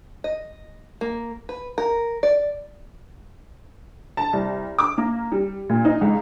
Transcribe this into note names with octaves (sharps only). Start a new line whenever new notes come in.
D#5
A#3
B4
A#4
D5
A5
C2
D6
A#3
G3
A#2
D#4
C#2